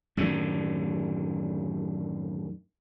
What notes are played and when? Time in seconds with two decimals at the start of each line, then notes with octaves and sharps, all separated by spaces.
0.17 F#2 A2 D3 D#3